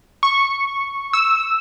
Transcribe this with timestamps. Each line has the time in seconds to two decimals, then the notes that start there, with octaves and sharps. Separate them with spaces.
0.23 C#6
1.13 E6